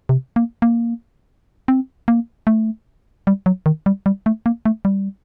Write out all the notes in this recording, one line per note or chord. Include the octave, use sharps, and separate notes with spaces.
C3
A#3
A#3
C4
A#3
A3
G3
F#3
D#3
G3
G3
A3
A#3
A3
G3